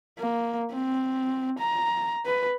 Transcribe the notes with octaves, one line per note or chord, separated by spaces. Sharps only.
A#3
C4
A#5
B4